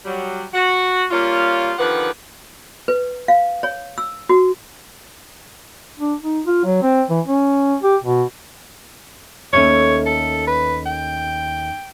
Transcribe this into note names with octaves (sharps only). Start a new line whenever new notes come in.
F#3 G3
F#4
G3 A#3 C#4 F4
D3 D#3 F3 G4 B4 F#5
B4
F5
C#5
E6
F#4
D4
D#4
F4
F#3
C4
E3
C#4
G4
B2
D#2 A3 C#4 C#5
A4
B4
G5